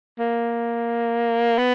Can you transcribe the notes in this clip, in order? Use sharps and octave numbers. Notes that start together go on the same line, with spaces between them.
A#3
B3